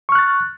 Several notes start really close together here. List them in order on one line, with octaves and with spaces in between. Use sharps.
C#6 F6 F#6 A6